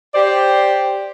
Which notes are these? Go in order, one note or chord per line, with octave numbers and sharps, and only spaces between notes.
G4 C5 D5